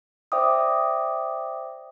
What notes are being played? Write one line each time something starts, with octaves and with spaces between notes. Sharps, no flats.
C5 D5 E5 G5 D6 D#6